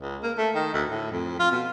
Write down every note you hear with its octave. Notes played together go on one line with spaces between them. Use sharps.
C#2
A#3
A3
D#3
D2
A2
F2
F4
B2